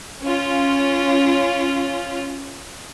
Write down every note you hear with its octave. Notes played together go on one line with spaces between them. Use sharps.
C#4 F4